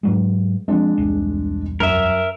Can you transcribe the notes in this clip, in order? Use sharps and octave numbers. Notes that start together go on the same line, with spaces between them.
G#2 F#3 G#3
F3 G#3 C4 D4
E1 C2
F#2 A#4 E5